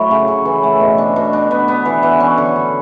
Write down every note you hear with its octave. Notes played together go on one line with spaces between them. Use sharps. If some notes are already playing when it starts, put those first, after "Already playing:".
Already playing: F#3 A3 E4
C#3
C#3
E3
A3
B2
D4
B2
D4
B3
B3
E3
E3
C#4
D3
D3